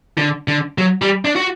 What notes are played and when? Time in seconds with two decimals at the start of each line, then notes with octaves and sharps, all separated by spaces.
0.18 D3
0.48 D3
0.78 F#3
1.02 G3
1.25 D4
1.36 F#4